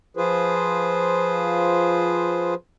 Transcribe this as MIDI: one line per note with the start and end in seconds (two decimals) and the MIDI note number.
0.17 2.54 53
0.17 2.54 65
0.17 2.54 68
0.17 2.54 71
0.17 2.54 72